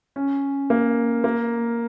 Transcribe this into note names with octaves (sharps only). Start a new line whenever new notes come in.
C#4
A#3
A#3